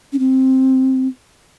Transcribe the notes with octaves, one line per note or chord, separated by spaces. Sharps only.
C#4
C4